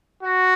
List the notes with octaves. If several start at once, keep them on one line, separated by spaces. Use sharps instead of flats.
F#4